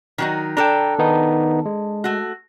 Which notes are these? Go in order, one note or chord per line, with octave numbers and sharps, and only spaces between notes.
D#3 F#3 D#4
D4 A4 G5 A#5
D#3 B3 D#4
G#3
A3 F#4